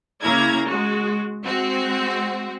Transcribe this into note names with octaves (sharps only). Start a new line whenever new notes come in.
C#3 A#3 E4 A#5 G#6
G#3 F#4
G#3 C4 F#4